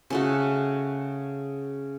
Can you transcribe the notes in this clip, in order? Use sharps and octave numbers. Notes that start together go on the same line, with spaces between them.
C#3 A3 F#4